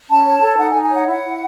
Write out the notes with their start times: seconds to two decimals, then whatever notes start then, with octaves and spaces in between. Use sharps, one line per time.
0.09 C#4 A5
0.26 C#5
0.41 A4
0.58 D#4 F#5
0.71 G#5
0.74 D#4
0.83 G#5
0.91 C#5 F#5
1.07 E4 F#5
1.24 E4